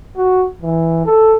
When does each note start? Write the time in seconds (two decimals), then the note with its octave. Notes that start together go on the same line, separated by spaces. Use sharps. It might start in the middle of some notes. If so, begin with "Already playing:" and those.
0.16 F#4
0.63 E3
1.06 A4